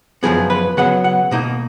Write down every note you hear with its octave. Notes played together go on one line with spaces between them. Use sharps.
F#2 F3 B3 G#4
B4
C#3 F#3 B3 F#5
F#5
B2 A#3 D#4